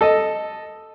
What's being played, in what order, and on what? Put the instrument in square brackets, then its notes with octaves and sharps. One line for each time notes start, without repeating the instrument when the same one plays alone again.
[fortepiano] A4 D#5